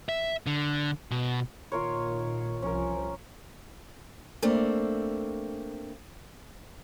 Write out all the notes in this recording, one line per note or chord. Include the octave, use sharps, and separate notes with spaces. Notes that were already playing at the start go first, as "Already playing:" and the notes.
E5
D3
B2
A#2 D#3 F4 A#4 C#5
C2 F3 C#4 A#4
A3 A#3 C4 D4